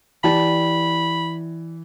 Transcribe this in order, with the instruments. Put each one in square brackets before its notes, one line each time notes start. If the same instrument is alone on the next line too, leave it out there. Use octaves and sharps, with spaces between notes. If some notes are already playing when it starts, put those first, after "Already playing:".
[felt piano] E3 [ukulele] G4 D5 A5 [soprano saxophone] B5